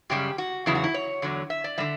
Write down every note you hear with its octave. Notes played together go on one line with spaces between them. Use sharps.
F#2 C#3 G3 G4
F#4
E2 C#3 F#3 E4
F#4
E4
C#5
E2 D3 F#3
E5
D5
D3 G3 E5